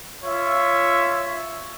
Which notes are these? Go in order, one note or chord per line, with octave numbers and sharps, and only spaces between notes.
F4 C#5 E5